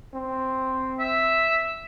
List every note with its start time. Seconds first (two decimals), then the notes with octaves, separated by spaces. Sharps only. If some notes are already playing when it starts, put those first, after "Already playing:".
0.14 C4
0.99 E5